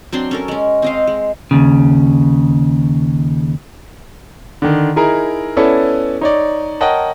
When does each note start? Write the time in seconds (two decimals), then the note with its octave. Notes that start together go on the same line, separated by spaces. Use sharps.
0.12 F#3 C4 D4 C6
0.31 C#4 A4 A#4
0.48 G#3 C#4
0.82 C4 D#5 F5
1.07 G#3
1.51 D#2 C#3
4.62 D3 D#3
4.96 D#4 E4 G#4 A#4
5.57 B3 C#4 E4 A4 D5
6.21 D#4 C#5 D5
6.81 A#4 C#5 D#5 F#5 G5 A5